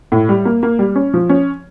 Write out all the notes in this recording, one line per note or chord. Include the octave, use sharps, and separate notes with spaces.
A2
G3
A#3
A#3
G3
C#4
F3
C#4